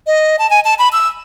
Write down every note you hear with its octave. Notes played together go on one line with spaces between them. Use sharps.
D#5
A5
G#5
A5
B5
E6